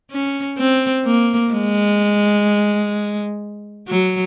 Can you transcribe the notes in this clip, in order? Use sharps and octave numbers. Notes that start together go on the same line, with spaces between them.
C#4
C4
A#3
G#3
F#3